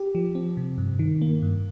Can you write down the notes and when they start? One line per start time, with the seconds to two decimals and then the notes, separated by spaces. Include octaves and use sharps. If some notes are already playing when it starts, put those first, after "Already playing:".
Already playing: G4
0.15 F3
0.35 C4
0.57 C3
0.78 G2
0.99 D#3
1.22 A#3
1.42 G2